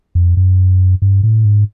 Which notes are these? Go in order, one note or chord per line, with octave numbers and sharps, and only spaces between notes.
F2
F#2
G2
A2
G#2